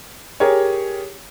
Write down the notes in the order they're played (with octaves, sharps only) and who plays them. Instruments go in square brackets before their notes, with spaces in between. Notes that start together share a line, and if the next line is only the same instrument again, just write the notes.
[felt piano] G4 G#4 A#4 C#5